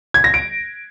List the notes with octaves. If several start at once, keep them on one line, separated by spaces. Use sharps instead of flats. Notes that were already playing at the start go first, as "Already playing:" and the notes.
G#6
A#6
D7